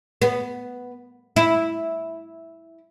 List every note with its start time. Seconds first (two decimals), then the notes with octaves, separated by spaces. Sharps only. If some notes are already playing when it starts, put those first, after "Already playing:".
0.22 B3
1.36 E4